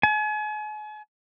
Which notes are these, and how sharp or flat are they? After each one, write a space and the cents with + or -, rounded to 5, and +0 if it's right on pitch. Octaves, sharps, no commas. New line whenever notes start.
G#5 +40